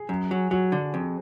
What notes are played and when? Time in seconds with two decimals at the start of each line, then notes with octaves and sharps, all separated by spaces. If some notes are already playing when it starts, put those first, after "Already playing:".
Already playing: G#4
0.09 F#2
0.31 F#3
0.51 F#3 F#4
0.72 D3
0.94 F2